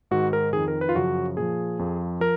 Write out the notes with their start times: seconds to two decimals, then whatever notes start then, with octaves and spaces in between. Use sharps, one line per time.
0.11 G#2 D#3 F#4
0.33 A#4
0.53 F2 D#3 G#4
0.68 A#4
0.81 B4
0.89 F4
0.95 F#2 C#3 F3 F#4
1.37 A#2 F3 G#4
1.79 F2 F3
2.20 F3 A#4